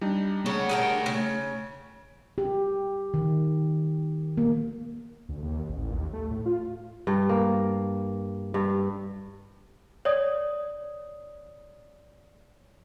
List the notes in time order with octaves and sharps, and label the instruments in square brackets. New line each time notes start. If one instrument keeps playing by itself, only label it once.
[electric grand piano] G3 D4 D#4
[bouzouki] C#3 [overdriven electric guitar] A3 F#5
[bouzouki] G#4 A#4 G5
C#3
[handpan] G4
D#3
A#3
[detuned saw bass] D2
D#2
A1
D#2
A3
A2
F4
[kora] G2
A#3
G2
[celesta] C#5 D5 D#6